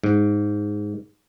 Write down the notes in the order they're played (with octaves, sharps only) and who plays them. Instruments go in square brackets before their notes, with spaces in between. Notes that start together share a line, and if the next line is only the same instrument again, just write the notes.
[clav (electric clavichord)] G#2